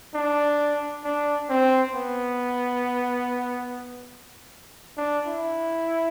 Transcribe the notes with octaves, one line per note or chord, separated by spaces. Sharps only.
D4
D4
C4
B3
D4
E4